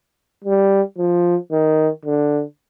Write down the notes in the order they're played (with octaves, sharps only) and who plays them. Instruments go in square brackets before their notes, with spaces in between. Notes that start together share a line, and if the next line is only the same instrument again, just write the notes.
[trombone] G3
F3
D#3
D3